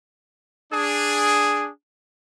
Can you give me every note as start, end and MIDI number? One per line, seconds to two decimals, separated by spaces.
0.73 1.70 62
0.73 1.70 68